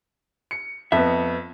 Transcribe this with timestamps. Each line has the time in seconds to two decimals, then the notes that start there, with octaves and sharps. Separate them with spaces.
0.51 C#7
0.92 F2 B3 E5